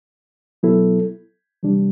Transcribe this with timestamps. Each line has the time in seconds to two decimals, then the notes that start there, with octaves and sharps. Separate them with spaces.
0.63 B2 F#3 B3 E4 A4
1.63 C3 E3 G3 D4